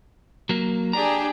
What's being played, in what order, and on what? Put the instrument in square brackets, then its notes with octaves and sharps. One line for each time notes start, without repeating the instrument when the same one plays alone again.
[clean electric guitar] F#3 A#3
[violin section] D4 G4 G#4 [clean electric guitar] A#5